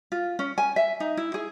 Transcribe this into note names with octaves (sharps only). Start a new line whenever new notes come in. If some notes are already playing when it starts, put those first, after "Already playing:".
F4
C#4
G#5
E5
D#4
E4
G#4